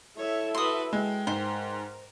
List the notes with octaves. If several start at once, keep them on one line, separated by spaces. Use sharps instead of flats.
E4 A4 C#5 E5
F#4 B4 C6 D#6
G#3 G5
G#2 A#4 C5